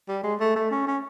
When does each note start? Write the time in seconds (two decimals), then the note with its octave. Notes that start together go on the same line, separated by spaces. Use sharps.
0.08 G3
0.24 G#3
0.40 A3
0.56 A3
0.71 C#4
0.87 C#4